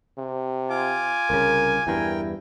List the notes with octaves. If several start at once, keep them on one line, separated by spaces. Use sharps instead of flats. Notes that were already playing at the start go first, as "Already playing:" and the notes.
C3
F4 G#5 D6
C2 C#3 A#4
E2 G2 E4 A#4 G5